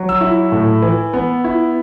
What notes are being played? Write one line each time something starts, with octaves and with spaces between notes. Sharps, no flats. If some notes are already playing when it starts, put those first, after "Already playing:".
Already playing: F#3
E6
E4
A2
E3
B3
E4